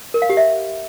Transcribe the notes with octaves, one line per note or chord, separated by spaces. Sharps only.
A#4
F5
G4
E5